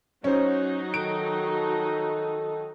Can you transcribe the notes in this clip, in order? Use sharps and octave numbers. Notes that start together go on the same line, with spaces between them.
F#3 C#4 D#4 F#4 C5
D#3 A4 D7